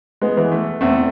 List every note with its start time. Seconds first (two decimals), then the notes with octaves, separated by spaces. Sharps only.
0.21 G#3 B3
0.37 E3
0.52 A3
0.81 E2 A3 C4